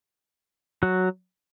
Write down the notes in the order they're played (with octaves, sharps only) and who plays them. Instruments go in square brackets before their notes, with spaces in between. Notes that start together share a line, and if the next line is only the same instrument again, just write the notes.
[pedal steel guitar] F#3 F#4